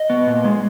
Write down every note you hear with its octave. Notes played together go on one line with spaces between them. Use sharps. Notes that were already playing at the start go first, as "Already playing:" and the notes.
Already playing: D#5
B3
A#2
G#3